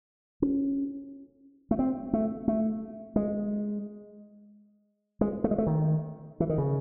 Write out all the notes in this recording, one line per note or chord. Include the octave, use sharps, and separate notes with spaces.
C#4
A3
C4
A3
A3
G#3
G#3
A3
G#3
A3
D#3
E3
D#3
C#3